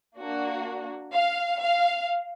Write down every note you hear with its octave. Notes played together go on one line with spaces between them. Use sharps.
A#3 D4 F#4
F5
F5